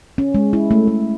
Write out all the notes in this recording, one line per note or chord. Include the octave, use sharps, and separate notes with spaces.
C#4
G#3
E4
A3
A3